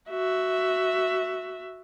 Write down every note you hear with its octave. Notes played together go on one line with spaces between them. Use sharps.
F#4 E5